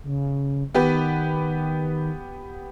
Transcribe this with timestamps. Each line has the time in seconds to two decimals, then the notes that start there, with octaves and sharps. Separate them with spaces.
0.04 C#3
0.74 D#3 B3 G4 B4